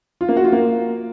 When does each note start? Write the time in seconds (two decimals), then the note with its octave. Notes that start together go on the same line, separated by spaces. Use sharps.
0.21 F4
0.29 A#3
0.37 F#4
0.44 F4
0.52 A#3